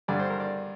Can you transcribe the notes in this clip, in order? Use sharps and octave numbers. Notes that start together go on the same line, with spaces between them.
G2 D3 D5
C5
A#4
D5